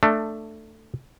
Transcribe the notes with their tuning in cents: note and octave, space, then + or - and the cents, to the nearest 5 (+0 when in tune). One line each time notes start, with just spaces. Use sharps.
A3 +10 D4 +20